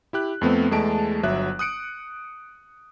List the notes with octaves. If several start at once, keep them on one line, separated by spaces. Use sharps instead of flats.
E4 G4 F#6
F2 A3 B3 C4
E2 G#3 A3 A5 D7
G1 F#3 E5 F#6
D#6 F#6 C#7 D7